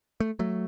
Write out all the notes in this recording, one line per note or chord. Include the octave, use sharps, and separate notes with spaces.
A3
F#3 A3